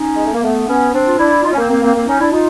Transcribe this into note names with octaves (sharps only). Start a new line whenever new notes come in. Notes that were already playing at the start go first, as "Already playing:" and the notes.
Already playing: C#4 D#4
G#3
A3
A#3
A3 B3
B3 C#4
C4 D4
F4
D4 E4
D#4 F4
C#4
A#3 C4
A#3 C4
A#3 C4
A#3 C4
C#4 D#4
D4 E4
D#4 F4